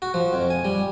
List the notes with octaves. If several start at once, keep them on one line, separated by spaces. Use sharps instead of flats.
F#4
F3
F2
G#5
G3